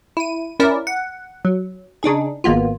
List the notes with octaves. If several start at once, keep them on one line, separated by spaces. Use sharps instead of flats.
E4 D#7
C#4 E4 A#4 D5
F#5
F#3
C#3 D4 D#4 G#4
G#1 A#3 B3 F4